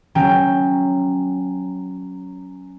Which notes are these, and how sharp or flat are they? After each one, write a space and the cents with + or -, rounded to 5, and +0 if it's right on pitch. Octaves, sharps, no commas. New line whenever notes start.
F#3 +0 C#4 +0 G5 +10